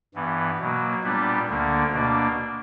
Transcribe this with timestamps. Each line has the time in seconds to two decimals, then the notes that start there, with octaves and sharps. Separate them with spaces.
0.15 G2 E3 B3
0.59 B2 F#3 A#3
1.03 A#2 G3 B3 D4
1.48 D2 D3 A#3 D4
1.92 B2 A#3 D4